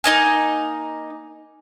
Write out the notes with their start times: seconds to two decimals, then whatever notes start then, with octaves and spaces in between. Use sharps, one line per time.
0.04 A#3 D#4 D#5 G#5